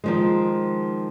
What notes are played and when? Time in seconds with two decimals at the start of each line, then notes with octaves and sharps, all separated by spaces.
0.04 D#3 F3 G#3